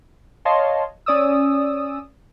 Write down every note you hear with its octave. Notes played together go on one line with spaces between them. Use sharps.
C#5 D#5 F5 A5 C6
C#4 D5 D#6 E6